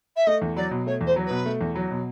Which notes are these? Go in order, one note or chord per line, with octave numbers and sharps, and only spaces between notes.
E5
A3 D#5
E2
F#3 D5
B2
A3 C#5
E2
C5
F#3
B2 B4
A3
E2
F#3
B2